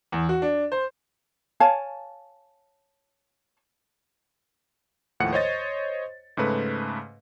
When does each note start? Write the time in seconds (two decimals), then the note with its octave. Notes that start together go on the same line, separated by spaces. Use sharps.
0.12 E2
0.29 F#4
0.42 D4
0.72 C5
1.60 C#5 F5 G#5 A5
5.20 D#2 A2 F3 F#5 C#7
5.33 C5 C#5 D#5 A6
6.37 G#2 C#3 A3 B4